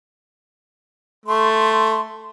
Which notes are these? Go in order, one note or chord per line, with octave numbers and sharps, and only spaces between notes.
A3 C6